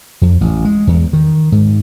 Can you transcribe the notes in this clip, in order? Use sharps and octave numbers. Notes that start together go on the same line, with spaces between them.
F2
A1
G#3
E2
D#3
G#2